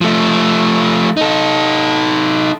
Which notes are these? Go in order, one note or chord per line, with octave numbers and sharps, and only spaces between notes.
F3 A3
D#4 A4